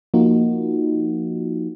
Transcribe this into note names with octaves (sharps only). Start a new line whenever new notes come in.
F3 A#3 D#4 F4 F#4